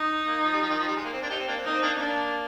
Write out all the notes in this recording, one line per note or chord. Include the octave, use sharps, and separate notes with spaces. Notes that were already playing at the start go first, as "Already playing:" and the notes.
Already playing: D#4
A#3
F3
G3
F3
D#3
F3
G3
G#3
A#3
C4
A#3 D4
D#4 G4
C4
A#3 D4
C4
A#3 D#4
C4
A#3 D4
A#3 D4